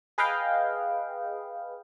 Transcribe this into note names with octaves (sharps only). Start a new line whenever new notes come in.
G#4 B4 D#5 F5 G5